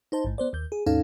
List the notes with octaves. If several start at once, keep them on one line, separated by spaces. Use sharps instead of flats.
D#4 C5 A5
A1 G#2
B3 C5 D5
D#2 G6
G#4
D#2 G#2 C#4 D#4 A4 F5